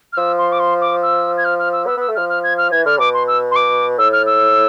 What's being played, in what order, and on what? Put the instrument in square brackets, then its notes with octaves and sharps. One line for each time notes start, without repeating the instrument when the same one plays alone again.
[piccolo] F6
[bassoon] F3 [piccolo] E6
[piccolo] C6
D6
C6
D6
E6
G#6
F6
F6
E6
[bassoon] B3 [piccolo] E6
[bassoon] B3 [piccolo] E6
[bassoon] A3
[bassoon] F3 [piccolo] F6
[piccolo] F6
G#6
F6
[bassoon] E3 [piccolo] G#6
[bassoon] D3 [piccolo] F6
[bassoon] B2 [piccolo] D6
[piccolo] C6
E6
C6
D6
[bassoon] A2 [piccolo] E6
[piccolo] F6
E6